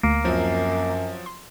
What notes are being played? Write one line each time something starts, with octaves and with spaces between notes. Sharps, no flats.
D2 A#3
F#2 F3 F#3 C4
C6